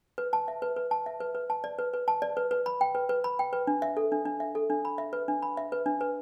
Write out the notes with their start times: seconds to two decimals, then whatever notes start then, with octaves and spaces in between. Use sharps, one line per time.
0.18 B4
0.33 A5
0.48 E5
0.62 B4
0.76 B4
0.91 A5
1.06 E5
1.20 B4
1.35 B4
1.50 A5
1.64 D5
1.79 B4
1.93 B4
2.08 A5
2.22 D5
2.37 B4
2.51 B4
2.66 B5
2.81 G5
2.95 B4
3.09 B4
3.24 B5
3.39 G5
3.53 B4
3.67 D4
3.82 E5
3.97 A4
4.12 D4
4.25 D4
4.40 E5
4.55 A4
4.70 D4
4.85 B5
4.98 E5
5.13 B4
5.28 D4
5.42 B5
5.57 E5
5.72 B4
5.86 D4
6.01 B4